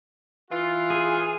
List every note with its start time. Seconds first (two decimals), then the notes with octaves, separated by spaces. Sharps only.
0.51 E3 F4
0.90 G#4